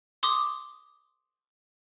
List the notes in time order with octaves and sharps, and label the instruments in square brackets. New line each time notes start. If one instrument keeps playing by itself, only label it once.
[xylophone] C6 D6 D#6